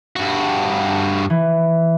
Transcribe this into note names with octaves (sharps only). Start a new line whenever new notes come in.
G2 F#4
E3